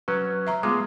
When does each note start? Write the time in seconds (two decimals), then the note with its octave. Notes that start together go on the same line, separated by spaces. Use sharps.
0.08 F#3 C#4 B4
0.47 E5 A#5 C#6
0.63 G#3 A3 B3 F4 D6